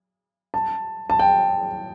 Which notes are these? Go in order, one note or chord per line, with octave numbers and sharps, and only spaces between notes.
A5
A5
G5